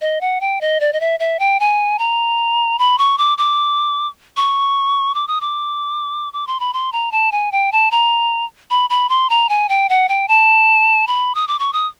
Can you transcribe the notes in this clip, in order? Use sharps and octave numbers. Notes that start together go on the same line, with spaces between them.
D#5
F#5
G5
D#5
D5
D#5
E5
E5
G5
G#5
A#5
B5
C#6
D6
D6
C#6
D6
D#6
D6
D6
C6
B5
C6
A#5
A5
G#5
G5
A5
A#5
B5
B5
C6
A#5
G#5
G5
F#5
G5
A5
B5
D#6
D6
C#6
D#6